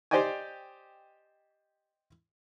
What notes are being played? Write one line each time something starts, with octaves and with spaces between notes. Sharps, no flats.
G4 C5 D5 D#5 G5 G#5